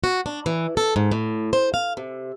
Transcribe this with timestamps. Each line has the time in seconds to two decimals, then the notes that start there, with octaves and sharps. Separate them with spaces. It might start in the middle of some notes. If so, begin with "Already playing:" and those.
0.04 F#4
0.26 D4
0.46 E3
0.77 A4
0.96 G#2
1.11 A2
1.53 C5
1.74 F5
1.97 C3